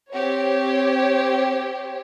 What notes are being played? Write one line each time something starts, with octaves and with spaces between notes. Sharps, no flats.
C4 G4 C#5